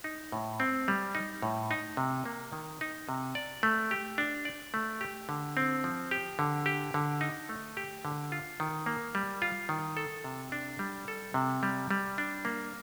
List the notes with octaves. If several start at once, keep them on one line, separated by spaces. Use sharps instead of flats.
D#4
A2
C4
G3
D#4
A2
D#4
C3
A#3
D#3
D#4
C3
D5
A3
G4
D4
D5
A3
G4
D3
C4
F3
G4
D3
G4
D3
D#4
A3
G4
D3
F4
D#3
A#3
G3
F4
D#3
A4
C3
D4
G3
A4
C3
G3
G3
D4
A#3